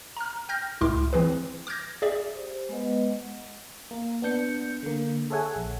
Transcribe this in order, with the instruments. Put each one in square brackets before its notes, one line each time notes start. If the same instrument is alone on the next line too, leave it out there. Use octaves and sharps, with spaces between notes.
[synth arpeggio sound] A#5 F6
G5 F6 G6 A#6
C#2 A2 E4 C6 D6 F6
E3 C4 G#4 B4
D6 F6 G6 G#6 A#6
G#4 D5 E5
[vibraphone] G4 C5
G#3 B3 B4 D#5 F#5
[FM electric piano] A#3
B3 D4 G6 C#7
D3 A#3
G#4 A4 C#5 E5 F#5 G#5
A#1